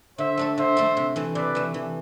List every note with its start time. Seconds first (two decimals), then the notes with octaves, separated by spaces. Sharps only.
0.18 D3 C5 E5
0.37 A3 D4 A4
0.57 D3 C5 E5
0.77 A3 D4 A4
0.97 C3
1.16 E3 A3
1.35 C3 B4 D5
1.55 E3 A3
1.74 E3